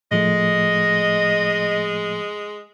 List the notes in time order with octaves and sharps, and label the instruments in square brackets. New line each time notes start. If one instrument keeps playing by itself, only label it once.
[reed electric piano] A2 F3 A3 [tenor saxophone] G#3 [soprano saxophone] D#5